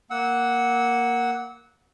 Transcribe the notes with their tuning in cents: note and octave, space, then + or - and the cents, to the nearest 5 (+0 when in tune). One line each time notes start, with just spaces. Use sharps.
A#3 +0 F#5 +0 E6 -30